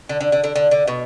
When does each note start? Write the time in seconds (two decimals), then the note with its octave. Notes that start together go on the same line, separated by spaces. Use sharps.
0.09 D3
0.21 D3
0.32 D3
0.44 D3
0.56 D3
0.71 D3
0.88 B2